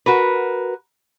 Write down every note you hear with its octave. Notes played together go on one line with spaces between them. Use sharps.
F#4 A#4 B4